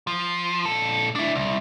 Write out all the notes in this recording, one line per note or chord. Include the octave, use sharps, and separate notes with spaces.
F3
A#2 A4
D4 E4
C2